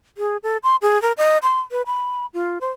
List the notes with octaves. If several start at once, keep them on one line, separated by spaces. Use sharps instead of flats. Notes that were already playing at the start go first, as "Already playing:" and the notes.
G#4
A4
C6
G#4
A#4
D#5
C6
B4
B5
F4
C5